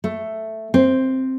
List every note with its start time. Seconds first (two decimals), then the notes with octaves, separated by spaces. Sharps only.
0.04 A3
0.74 C4